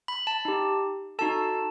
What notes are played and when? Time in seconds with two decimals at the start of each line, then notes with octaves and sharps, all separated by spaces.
0.08 B5
0.27 A5
0.45 D#4 G4
1.19 D#4 F#4 A4 A5